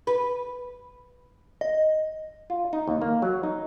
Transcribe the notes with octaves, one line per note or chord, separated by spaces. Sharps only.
B4
D#5
F4
D#4
D#2
A#3
F#3
D#4